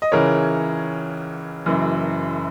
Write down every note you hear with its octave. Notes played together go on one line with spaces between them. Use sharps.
D#5
C#2 C#3 E3 A#4 C#5
F#1 F#2 E3